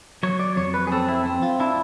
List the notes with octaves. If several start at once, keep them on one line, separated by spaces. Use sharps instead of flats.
F#3 C#5
D5
F2 C#5
B4
G#4
C4 A4
E4
C4
F4
D4 E4